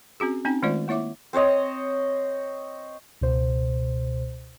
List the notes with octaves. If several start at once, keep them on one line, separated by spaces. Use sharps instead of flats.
C4 C#4 F#4 G#4
C4 C#4 D#4 G5
D#3 G#3 A3 F4 C5 D5
A#3 E4 C#5 E5 D6
C4 C5 C#5 D#5
C#2 B2 C5